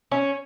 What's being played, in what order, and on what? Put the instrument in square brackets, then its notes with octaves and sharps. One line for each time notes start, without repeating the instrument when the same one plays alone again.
[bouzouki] C#4